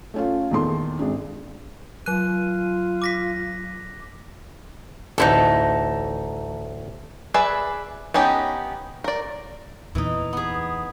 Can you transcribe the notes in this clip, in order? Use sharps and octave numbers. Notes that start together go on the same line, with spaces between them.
A3 C#4 F4
E2 A#2 D#3 A4 C6
G#1 G#3 D4
F#3 F4 F#6 D#7
D6 A#6 B6
A1 D2 D#4 E4 A4
G#4 B4 D5 E5
B3 C#4 D#4 G4
A#4 D5
E2 A#2 E3 D#4
B3 G#4